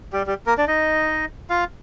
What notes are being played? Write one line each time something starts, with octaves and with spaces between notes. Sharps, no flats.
G3 G4
G3 G4
A#3 A#4
D4 D5
D#4 D#5
F4 F5